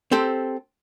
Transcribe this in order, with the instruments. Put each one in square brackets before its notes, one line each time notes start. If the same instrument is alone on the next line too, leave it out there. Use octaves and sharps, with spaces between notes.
[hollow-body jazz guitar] C4 G4 A4 C5